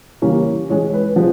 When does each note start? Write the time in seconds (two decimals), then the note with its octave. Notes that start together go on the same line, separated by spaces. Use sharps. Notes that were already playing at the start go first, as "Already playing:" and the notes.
0.22 C#3 E3 G3 A#3 C#4
0.70 E3 G#3 C#4 C#5
0.93 B4
1.16 C3 F3 G#3